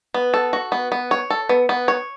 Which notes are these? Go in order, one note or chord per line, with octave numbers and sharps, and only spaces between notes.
B3
A4
F#4
B3
B3
C#5
A4
B3
B3
C#5